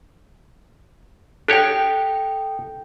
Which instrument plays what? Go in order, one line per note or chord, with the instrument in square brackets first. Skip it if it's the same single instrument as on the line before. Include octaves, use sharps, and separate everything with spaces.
[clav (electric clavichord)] D4 G4 C#5 [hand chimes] A4 G5